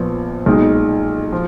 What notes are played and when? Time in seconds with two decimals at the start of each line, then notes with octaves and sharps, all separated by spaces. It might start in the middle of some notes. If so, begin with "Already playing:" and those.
Already playing: A#1 A#2 F3 B3
0.46 B1 A#2 G#3 D#4
1.32 F3